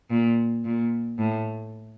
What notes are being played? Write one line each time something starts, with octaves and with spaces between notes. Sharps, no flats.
A#2
A#2
A2